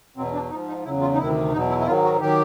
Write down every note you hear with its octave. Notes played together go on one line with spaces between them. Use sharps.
E2 B2 F#3 C4
D4
G#2 F3 D#4
D#4
E2 C#3 F#3 E4
F4
D#4
D2 C3 D#3 E4
E2 B2 F#3 D#4
E4
E4
G#2 D#3 F#3 F4
F#4
D#3 F#3 G4